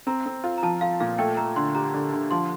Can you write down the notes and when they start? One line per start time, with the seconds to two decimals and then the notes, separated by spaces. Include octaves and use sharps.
0.07 C4 A#5
0.26 C4
0.44 F4
0.58 A#5
0.63 F3 A5
0.81 F4 F5
1.00 A#2 F5
1.18 A3 G5
1.37 A3 A#5
1.56 D3 C6
1.75 G4 A#5
1.94 D3
2.12 D3
2.31 F3 C6